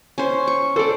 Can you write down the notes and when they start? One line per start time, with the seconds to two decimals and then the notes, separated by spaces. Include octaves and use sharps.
0.18 C#4 C5
0.47 C#6
0.76 A4 C5 D5